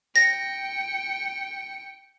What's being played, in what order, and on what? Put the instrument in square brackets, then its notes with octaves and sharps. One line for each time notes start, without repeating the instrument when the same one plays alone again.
[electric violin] G5 C#7 [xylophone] A#6